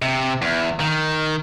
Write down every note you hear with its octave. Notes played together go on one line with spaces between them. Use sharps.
C3
E2
D#3